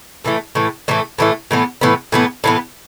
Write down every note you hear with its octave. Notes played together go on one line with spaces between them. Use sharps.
A2 E3 A3
A2 E3 A3
A2 E3 A3
A2 E3 A3
A2 E3 B3
A2 E3 B3
A2 E3 B3
A2 E3 B3